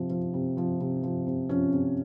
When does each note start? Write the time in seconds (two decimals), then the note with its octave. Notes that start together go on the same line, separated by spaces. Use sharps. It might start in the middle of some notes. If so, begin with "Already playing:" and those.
Already playing: C3 F3
0.10 F3
0.34 C3
0.57 F3
0.80 C3
1.03 F3
1.27 C3
1.49 F3 C#4
1.73 C3